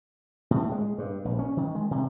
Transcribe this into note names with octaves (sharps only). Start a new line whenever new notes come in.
A2
G#3
G2
A#1
C#4
D#3
G#3
C3